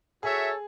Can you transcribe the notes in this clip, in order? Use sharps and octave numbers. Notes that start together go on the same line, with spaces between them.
F#4 G#4 A4 C#5 E5